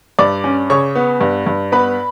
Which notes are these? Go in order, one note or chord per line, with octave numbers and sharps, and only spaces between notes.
G2 D5 D6
C#4
C#3 C#5 C#6
B3
G2
G2
B3 B4 B5